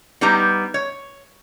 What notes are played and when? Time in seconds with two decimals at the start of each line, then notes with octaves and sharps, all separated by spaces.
0.21 G3 B3 D#4 G4 A#5
0.74 C#5